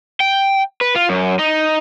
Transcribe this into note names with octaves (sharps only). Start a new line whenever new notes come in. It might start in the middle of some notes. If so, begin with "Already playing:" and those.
G5
B4
F4
F#2
D#4